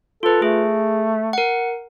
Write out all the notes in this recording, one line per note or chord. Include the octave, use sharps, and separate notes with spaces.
F4 A4 B4
A3 G#4
A#4 F#5